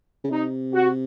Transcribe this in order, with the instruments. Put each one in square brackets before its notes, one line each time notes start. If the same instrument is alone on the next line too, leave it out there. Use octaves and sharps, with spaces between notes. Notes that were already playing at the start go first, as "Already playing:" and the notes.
[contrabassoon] C#3
[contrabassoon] C3 [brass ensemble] D#4
[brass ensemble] F#4